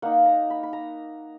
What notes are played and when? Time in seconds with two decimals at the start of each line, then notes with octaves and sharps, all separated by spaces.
0.02 A#3 D#4 F#5
0.25 A#5
0.50 B5
0.63 B5
0.73 A#5